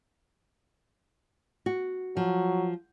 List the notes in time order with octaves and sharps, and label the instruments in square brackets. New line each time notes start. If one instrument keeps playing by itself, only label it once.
[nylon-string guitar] F#4
[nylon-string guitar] F3 [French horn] F#3